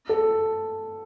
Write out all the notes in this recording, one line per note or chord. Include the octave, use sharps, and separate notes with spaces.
A4